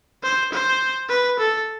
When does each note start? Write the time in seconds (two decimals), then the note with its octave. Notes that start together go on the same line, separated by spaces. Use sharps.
0.23 C5
0.52 C5
1.09 B4
1.39 A4